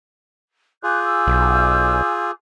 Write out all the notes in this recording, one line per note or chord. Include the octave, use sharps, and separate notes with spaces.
F4 G#4 G#5 D6 F#6 G6
E6
B1